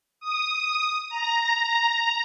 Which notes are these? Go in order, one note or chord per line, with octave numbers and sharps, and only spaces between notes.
D#6
A#5